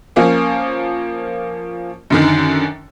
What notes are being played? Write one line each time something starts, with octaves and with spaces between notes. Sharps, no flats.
F3 A#3 C#4
F#2 D3 D#3